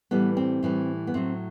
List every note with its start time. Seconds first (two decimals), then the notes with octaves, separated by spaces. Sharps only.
0.11 A2 E3 G3 B3
0.37 C4
0.63 A2 E3 G3
1.07 B3
1.14 A2 F#3 C4